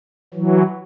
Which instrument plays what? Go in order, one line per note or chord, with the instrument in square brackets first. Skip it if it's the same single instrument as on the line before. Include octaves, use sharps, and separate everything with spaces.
[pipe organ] E3 F#3